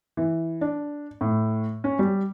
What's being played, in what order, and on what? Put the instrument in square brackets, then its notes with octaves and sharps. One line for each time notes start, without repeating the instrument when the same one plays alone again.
[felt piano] E3
D4
A2
C#4
G3